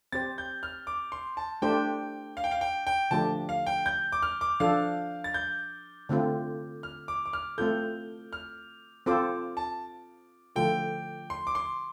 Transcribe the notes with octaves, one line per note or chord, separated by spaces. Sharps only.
C4 G4 C5 A6
G6
F6
D6
C6
A5
A3 D4 G4 C5 G5
F5
G5
F5
G5
G5
D3 F3 A3 D4 G4 A5
F5
G5
G6
D6
F6
D6
F3 D4 A4 F5
A6
G6
D3 A3 C4 F4
F6
D6
D6
F6
A3 C4 F4 A4 G6
F6
C4 F4 A4 C5 D6
A5
D3 F3 A3 F4 A4 G5
C6
D6
C6